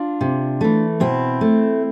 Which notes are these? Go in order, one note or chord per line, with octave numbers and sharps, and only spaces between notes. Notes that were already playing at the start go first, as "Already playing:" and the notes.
Already playing: D4 F4
C3
E3 A3
B2 C4 E4
A3